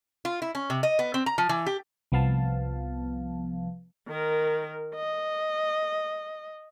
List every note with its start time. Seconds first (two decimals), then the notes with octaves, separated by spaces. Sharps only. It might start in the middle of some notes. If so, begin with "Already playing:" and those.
0.25 F4
0.42 E4
0.55 C#4
0.70 C3
0.83 D#5
0.99 B3
1.14 C4
1.26 A#5
1.38 F3
1.49 E3
1.66 G4
2.12 C2 F3 B3 F5 A5
4.08 D#3 A#4
4.95 D#5